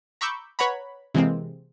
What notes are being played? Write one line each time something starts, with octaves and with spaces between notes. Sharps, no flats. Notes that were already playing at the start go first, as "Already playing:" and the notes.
A#5 B5 C#6 D6 E6 G6
B4 C#5 F#5 A#5 B5
C3 E3 G#3 A#3 C4